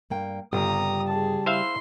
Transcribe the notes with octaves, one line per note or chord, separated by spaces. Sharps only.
G2 A#3 G5
G1 C#3 G3 G4 A#5 D#6
G#4 A5
E4 C5 E5 F5 C6